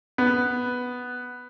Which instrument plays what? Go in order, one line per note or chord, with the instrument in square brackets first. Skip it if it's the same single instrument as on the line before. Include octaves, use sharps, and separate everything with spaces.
[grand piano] B3